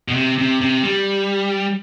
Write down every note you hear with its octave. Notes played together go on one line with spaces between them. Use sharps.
B2
C3
C3
C3
G3